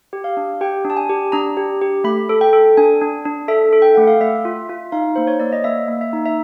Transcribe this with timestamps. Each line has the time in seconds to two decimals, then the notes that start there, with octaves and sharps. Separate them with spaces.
0.13 G4
0.24 F5
0.37 D4
0.61 G4 G5
0.85 D4
0.90 A5
0.97 G#5
1.09 G4
1.32 D4 A#5
1.57 G4
1.81 G4
2.04 A3 B5
2.29 A4
2.41 G5
2.53 A4
2.77 D4 G#5
3.01 D4
3.25 D4
3.48 A4 E5
3.73 A4
3.82 G5
3.95 A3 F#5
4.07 F5
4.21 A3 E5
4.45 F4
4.69 F4
4.92 D#4 F5
5.15 A#3 C5
5.27 C#5
5.40 A#3 D5
5.53 D#5
5.64 A#3 E5
5.88 A#3
6.01 E5
6.13 D#4
6.26 E5